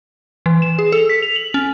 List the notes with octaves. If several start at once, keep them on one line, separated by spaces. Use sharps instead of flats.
E3
E7
G#4
A4
B6
F7
F#7
C#4